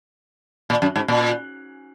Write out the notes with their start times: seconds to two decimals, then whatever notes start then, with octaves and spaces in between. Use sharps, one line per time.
0.70 A#2
0.82 F#2
0.96 G#2
1.08 A#2